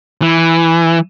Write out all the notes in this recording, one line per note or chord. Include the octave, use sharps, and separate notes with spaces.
E3